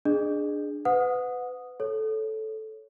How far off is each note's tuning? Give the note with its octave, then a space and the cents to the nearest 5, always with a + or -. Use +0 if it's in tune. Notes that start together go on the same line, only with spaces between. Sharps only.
D4 +5 G#4 +0 D#5 -40
B4 +30 F#5 -25 D#6 -10
A4 -10 C#5 +0